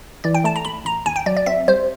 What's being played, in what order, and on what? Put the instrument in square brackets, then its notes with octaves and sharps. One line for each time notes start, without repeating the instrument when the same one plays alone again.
[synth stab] E3 [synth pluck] D5
[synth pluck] G5
[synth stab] A3 [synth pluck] A5
[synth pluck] A#5
[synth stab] A1 [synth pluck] B5
[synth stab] A1 [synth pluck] A#5
[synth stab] D#2 [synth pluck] G#5
[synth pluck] G5
[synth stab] F#3 [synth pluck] D5
[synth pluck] D5
[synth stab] C4 [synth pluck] E5
[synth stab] G3 [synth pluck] C5